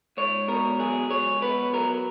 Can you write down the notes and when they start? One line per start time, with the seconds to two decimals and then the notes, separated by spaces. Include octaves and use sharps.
0.17 G#2 C#5
0.48 B2 A#4
0.79 F#3 G#4
1.10 C#2 C#5
1.42 B3 B4
1.73 F#3 A#4